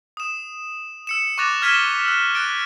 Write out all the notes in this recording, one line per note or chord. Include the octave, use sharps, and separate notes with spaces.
D#6 E7
E6 C#7 E7
C#6 D6 F#6 A6 A#6 F7
F6 G#6 B6 D#7 E7 G7
E6 F#6
F#6 A6 D7